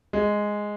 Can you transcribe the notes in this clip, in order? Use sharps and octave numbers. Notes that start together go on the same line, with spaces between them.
G#3